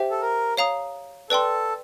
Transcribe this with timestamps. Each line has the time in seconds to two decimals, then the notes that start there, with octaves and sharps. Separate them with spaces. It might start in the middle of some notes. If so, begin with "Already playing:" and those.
Already playing: G4 C5 E5 G5
0.11 A4
0.21 A#4
0.57 C#5 F5 A#5 D#6
1.30 A4 B4 D5 G5 C6